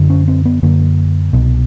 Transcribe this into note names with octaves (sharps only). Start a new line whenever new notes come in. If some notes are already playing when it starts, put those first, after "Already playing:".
Already playing: F#2 D3
C#4
C4
B3
F#2 D3 A#3
C2 B2